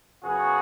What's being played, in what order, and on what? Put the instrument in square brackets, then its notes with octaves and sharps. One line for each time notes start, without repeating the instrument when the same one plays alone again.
[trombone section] F#2 C#3 F#3 B3 F#4 G#4